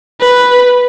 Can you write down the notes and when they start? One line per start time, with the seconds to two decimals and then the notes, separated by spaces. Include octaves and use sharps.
0.20 B4